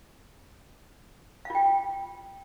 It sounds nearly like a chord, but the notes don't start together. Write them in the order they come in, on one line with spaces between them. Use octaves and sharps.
F5 F4 G5